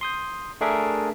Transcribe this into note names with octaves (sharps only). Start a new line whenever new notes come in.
C6 D#6 G6
A3 D4 G#4 A#4 E5